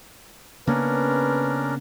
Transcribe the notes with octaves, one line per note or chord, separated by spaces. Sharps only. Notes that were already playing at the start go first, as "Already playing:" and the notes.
C#3 A#3 B3 C#4 D4 A#4 B4